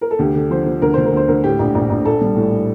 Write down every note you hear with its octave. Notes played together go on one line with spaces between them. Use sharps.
A#4
A4
D2 G4
D3
F3 C5
F3
D2 A#4
D2 C5
A#4
D2 C5
D2 A#4
A2 G4
A#1
A#1
A#1
A#1 A4
G3
A2